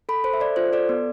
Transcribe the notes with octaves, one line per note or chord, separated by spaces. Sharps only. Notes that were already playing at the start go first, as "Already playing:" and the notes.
A4 B5
A4 C5
E5
A4 D5
F4 C5
A4 D5
B3